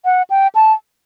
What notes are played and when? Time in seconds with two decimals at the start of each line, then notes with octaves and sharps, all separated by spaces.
0.05 F#5
0.30 G5
0.55 A5